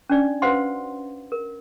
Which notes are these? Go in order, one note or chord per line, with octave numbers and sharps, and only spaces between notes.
C#4 D4 D5
F#4 B4 C5 F5 F#5 C6
A#4